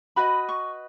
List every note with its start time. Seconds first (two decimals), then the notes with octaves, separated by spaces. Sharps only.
0.16 F#4 B4 D#5 B5
0.49 C#6